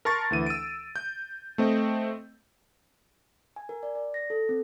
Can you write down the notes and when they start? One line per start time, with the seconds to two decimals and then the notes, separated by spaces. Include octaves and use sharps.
0.05 A#4 A5 C6 C#6 A6
0.30 D2 E3 D#7
0.47 E6 D7
0.96 G6
1.58 A3 C4 D#5
3.56 G#5
3.69 A#4
3.83 D5
3.95 D5
4.14 A#6
4.30 A4
4.49 C4